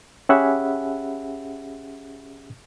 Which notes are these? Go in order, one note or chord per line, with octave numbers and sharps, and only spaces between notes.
C#4 G4 G#4 E5 F#5 B5